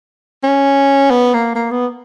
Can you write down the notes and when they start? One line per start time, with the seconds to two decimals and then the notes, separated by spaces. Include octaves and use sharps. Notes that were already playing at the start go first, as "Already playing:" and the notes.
0.44 C#4
1.10 B3
1.34 A#3
1.55 A#3
1.71 B3